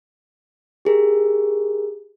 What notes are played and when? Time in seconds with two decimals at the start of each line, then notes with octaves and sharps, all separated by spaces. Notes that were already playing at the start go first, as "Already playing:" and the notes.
0.85 G4 G#4 A#4